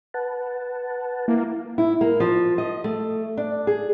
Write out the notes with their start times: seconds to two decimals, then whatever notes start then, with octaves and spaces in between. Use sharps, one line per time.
0.14 B4 F#5 A5
1.28 A#3 E4
1.78 E4
2.01 A#3
2.20 F3
2.58 D#5
2.84 A3
3.37 D4
3.67 G#4